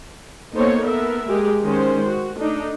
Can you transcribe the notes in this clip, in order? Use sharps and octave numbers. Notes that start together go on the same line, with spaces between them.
A#3 B3 D#4 A4 C5 C#5
B3 A4 A#4 E5
G#3 G4 G#4 A#4
D#3 G#3 C#4 C5
F#4
A3 D4 D#4